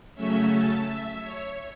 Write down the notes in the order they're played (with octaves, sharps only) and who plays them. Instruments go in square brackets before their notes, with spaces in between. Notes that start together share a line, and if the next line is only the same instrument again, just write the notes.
[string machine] C#3 F#3 A3 C#4 E5
A5
E5
C#5